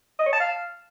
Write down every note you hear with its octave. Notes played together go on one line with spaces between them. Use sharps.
D#5
C#5
A5
F5